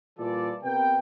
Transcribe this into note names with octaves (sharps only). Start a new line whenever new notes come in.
A#2 E3 G3 F4 A4 D5
C3 B3 A#4 B4 G5